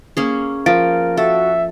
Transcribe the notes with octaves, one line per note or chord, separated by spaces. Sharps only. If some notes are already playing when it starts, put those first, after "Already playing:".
A#3 C#4 G#4
F3 A#4 F5 A6 D7
F#4 A4 E5